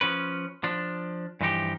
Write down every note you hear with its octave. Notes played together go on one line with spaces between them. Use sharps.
F3 C#4 B4
F3 D4
G2 E3 F3 D#4 G4